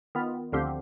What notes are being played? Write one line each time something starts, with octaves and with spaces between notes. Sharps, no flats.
D#3 B3 F4
D2 D3 F3 C4 G4